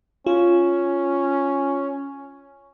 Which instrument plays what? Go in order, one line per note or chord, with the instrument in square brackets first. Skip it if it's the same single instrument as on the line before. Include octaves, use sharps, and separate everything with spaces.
[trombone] C#4 [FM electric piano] F4